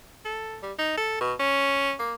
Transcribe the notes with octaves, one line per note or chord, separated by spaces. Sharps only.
A4
G3
D#4
A4
B2
C#4
A#3